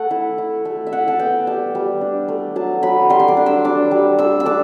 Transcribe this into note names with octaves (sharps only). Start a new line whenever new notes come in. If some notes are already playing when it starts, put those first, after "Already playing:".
Already playing: A3 F#5
E4
E4
A3
E5
E4 F#5
A5
B3 G5
G3 A5
G3
D4
A3
F#3 A5
F#3 B5
G3 C6
C6
D6
D4
E6
D4 D6
G3
A3 E6
E6
D4 D6